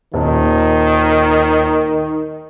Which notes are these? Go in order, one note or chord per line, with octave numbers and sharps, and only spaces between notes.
D#1 D#3